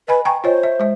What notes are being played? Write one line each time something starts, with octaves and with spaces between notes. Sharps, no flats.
B4 D#5 G#5 B5
G5 G#5 A#5 C#6
F4 C5 C#5 D#5
E5
G#3 E5